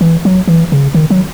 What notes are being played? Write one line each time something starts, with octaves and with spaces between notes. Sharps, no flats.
E3
F#3
E3
C#3
D#3
F#3